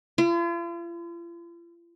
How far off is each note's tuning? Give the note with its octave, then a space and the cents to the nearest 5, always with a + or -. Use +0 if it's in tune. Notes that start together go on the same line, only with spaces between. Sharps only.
F4 -45